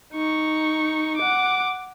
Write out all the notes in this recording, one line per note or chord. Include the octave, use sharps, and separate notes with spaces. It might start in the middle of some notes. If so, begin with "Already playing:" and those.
D#4 C#6
F#5 D6